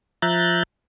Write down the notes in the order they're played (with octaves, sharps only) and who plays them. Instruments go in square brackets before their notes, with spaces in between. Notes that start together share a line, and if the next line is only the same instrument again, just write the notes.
[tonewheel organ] F3 E5 A#5 F#6 G6 A6